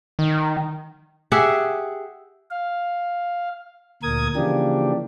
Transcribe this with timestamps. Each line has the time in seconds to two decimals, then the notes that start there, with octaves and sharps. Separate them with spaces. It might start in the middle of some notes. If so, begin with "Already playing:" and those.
0.19 D#3
1.32 G4 G#4 E5 F#5
2.51 F5
4.03 D2 A#2 A#4 D#6 G#6
4.36 C#3 E3 F3 A#3 D4 G4